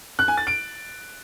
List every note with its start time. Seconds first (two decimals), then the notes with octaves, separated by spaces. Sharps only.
0.19 F#6
0.28 G#5
0.37 A6
0.47 D7